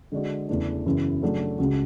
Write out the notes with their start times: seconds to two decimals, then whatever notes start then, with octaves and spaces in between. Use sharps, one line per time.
0.12 D3 G#3 D4 F#4
0.49 E2 C#3 E3 A3 D4
0.85 F#2 C#3 E3 B3 E4
1.22 C#3 F#3 A3 D4 F#4
1.59 C#2 C#3 G#3 C#4 F#4